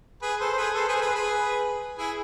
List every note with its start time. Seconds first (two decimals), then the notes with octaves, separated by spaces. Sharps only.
0.22 G#4 B4
0.40 A4 C5
0.53 C5
0.58 G#4 B4
0.75 A4 C5
0.88 G#4 B4
0.96 C5
1.01 G#4 B4
1.15 G#4 B4
1.98 E4 G#4